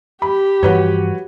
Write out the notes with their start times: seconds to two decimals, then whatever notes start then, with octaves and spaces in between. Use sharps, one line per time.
0.22 G4 B5
0.63 G2 E3 F3 F#4 B4 C#5